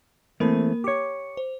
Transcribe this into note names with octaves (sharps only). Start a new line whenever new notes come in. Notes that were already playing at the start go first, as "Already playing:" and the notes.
E3 A3 A#3 C4 A#4 B5
G4 C#5 D6 C#7
C5